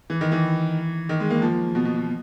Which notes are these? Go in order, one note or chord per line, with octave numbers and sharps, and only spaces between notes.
E3
D#3
E3
D#3
G#3
A#3
F3
B2
B2
B2